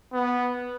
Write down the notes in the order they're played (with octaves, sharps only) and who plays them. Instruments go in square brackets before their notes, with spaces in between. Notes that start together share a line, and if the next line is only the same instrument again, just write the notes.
[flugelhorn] B3